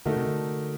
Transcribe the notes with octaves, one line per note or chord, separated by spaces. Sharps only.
D3 A3 D#4 F#4 A#4
C3
D3